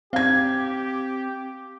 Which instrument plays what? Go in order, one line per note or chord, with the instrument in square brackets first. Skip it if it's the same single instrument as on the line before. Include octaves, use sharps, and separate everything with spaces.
[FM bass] C4 [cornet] G4 [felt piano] F5 G#6